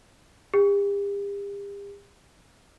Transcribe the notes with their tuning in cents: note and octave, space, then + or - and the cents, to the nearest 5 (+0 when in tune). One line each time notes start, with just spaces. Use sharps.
G4 +45